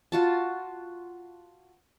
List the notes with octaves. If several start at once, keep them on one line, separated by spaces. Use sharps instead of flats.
F4 F#4 A5